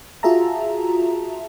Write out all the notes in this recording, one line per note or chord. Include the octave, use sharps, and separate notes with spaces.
F4 F#4 G#4 E5 A5 A#5